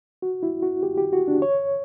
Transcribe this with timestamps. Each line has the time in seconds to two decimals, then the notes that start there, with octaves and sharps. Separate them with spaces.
0.22 F#4
0.43 E4
0.62 F#4
0.83 G4
0.98 G4
1.13 F#4
1.28 D4
1.42 C#5